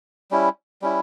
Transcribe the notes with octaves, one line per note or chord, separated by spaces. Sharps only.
G3 C#4 E4
G3 C#4 E4